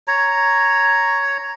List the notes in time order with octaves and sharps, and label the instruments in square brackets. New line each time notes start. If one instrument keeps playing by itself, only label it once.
[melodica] C#5 A#5